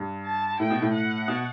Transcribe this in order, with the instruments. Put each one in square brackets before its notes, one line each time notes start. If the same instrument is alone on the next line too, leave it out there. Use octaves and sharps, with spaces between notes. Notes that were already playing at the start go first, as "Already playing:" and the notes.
Already playing: [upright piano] G2
[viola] A5
[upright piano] A2 [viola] G5
[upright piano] B2
A2
[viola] F#5
[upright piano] B2